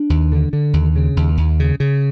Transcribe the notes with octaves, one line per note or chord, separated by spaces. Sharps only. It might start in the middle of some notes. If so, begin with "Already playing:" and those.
Already playing: D4
D#2
D3
D3
D#2
C#3
D#2
D#2
C#3
C#3